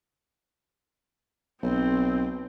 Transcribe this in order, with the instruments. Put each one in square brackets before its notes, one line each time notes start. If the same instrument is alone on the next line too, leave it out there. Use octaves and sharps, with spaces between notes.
[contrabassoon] B1 [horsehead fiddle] C4